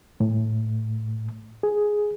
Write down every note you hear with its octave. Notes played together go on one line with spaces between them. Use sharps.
A2
G#4